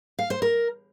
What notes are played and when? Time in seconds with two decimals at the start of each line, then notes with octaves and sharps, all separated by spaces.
0.19 F5
0.30 C5
0.42 A#4